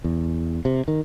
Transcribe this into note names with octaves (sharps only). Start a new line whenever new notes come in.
E2
C3
D#3